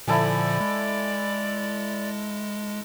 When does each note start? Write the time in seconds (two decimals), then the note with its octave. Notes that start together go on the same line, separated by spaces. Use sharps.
0.08 A#2 D3 F3 E4 A4 D5 G#5
0.61 G#3